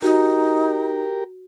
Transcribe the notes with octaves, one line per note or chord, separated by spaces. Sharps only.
D#4 F#4 G4 A#4